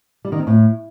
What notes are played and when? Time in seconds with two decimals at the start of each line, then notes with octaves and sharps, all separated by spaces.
0.25 G3
0.32 D#3
0.39 C4
0.47 A2